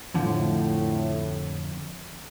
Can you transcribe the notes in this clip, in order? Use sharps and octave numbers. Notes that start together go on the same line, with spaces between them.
F2 A2 D3 F3